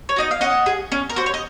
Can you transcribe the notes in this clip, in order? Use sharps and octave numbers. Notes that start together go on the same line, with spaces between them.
C#5
D#4 F#4 D#5
F5
C#4 D#5 F#5
G#4
C#4
A#4
F#4 C5
C#5
D#5